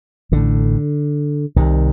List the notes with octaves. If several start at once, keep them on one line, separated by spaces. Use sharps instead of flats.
A1 A2 D3
C2 C3 D#3